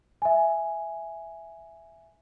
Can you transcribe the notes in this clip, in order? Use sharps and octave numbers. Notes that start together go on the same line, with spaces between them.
E5 G#5